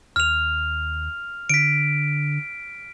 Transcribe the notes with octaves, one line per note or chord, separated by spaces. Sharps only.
D#2 F6 F7
D3 B6 D7